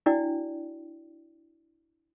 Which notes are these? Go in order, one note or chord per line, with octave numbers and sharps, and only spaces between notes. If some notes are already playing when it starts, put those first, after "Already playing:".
D4 E4 F#4 D5 G5